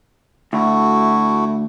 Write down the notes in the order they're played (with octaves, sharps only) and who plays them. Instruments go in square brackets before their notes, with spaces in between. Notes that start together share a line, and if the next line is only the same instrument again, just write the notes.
[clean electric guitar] D2 [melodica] A3 E4 F#4